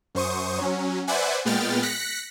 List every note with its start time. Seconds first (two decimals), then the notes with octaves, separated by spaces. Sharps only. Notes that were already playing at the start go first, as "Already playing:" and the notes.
0.15 F#2 C5 C#6 D#6
0.58 F#3 C#4
1.07 B4 C5 D5 E5 F#5 G#5
1.45 A#2 G#3 B3 G5 F6 A6
1.83 F#6 A#6 B6 C#7